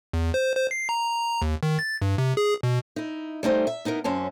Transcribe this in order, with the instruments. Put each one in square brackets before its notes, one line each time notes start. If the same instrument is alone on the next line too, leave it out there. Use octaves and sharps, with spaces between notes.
[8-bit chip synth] E2
C5
C5
C7
A#5
D#2
D#3
A6
G2
C3
G#4
B2
[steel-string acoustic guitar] D#4 E4
G3 A3 D#4 C5
E5
B3 D#4 E4 A#4
F#2 C4 C#4 A5